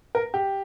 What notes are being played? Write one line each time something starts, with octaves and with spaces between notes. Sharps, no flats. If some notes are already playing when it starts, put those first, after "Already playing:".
A#4
G4